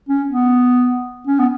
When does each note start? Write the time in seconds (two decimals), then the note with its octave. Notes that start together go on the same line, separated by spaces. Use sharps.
0.09 C#4
0.29 B3
1.27 C#4
1.39 B3